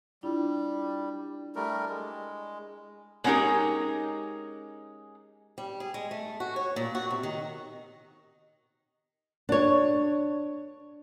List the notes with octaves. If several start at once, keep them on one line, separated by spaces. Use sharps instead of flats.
G3 D4 E4 F4
G3 A3 A#4
G#3
G#3 B3 C#4 D#4 G4 A#4
G3
G#4
G#3
A3
F#4
C#5
A#2
F#4
C3
D#3
D4 C#5